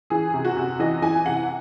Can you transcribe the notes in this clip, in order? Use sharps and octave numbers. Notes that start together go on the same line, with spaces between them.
E3 G#4
C3
F#4
C3
E3 D#5
E3 G#5
C3 F#5